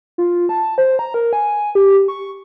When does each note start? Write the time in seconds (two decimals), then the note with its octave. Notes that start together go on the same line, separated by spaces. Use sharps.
0.18 F4
0.49 A5
0.78 C5
0.99 A#5
1.14 A#4
1.33 G#5
1.75 G4
2.08 C#6